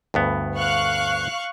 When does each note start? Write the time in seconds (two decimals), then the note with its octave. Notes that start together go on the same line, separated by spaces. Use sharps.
0.14 D2 G2 B3
0.56 F5 C#6 F#6